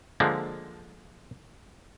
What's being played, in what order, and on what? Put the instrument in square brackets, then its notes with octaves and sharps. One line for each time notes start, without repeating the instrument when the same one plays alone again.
[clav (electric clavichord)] D3 F3 G#3 A#3